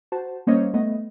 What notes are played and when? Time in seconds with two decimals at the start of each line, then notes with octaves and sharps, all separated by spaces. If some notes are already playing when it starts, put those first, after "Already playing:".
0.12 F#4 C5 A5
0.47 G3 A#3 C#4 C5 C#5 D#5
0.74 A3 B3 D#5